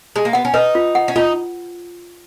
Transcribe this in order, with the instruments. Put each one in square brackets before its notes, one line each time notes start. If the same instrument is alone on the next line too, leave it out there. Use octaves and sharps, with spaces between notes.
[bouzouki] G#3
A#3
[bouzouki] B3 [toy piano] F#5
[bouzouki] C#4
[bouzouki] D#4 [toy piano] B4
[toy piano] F4
F#5
[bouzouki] C#4
[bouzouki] D#4 [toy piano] F4